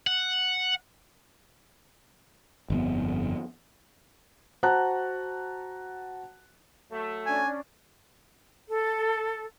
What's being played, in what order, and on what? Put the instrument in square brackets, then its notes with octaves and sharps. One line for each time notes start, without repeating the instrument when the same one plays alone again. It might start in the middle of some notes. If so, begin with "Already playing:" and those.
[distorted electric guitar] F#5
[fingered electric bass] G1 F2 B3
[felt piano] F#4 C5 F#5 A5 A#5 F#6
[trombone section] F#3 A3
[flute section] C#4 D4 D5 [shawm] G#5
[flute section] A4